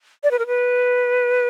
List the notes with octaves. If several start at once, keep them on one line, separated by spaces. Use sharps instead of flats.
D5
B4
A#4
B4